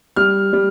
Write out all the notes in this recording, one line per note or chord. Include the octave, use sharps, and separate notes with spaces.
G3 F6
G3